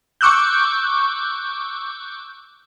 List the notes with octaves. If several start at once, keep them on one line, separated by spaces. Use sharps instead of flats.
C#6 D6 E6 F#6 G6